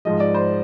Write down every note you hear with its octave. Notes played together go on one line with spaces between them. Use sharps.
G#2 F3 G#3 D#5
D5
C5